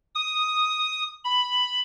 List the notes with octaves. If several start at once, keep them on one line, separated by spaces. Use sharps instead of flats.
D#6
B5